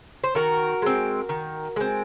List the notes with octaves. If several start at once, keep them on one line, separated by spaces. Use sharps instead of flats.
C5
D#3 F#4 A#4
G#3 C4
D#3
G#3 C4